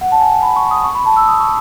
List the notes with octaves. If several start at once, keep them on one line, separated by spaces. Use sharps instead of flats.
F#5
A5
G#5
B5
C#6
C#6
D#6
C#6
B5
A5
E6
D#6
C#6